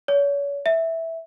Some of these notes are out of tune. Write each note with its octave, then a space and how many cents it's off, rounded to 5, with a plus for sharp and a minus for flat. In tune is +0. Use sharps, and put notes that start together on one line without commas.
C#5 +35
E5 -10